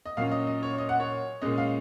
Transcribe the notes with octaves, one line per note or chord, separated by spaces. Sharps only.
D#5
A#2 F#3 C#4 F5
D#5
D#5
C#5
D#5
F#5
C#5
A#2 G#3 C#4 D#5
F5